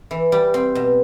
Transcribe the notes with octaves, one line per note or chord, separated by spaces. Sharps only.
E3
G3
C4
B2